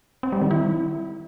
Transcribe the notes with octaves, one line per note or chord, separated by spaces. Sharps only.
C4
G3
D#3
E4